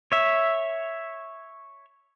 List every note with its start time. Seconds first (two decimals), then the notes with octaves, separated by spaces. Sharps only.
0.12 C#5 E5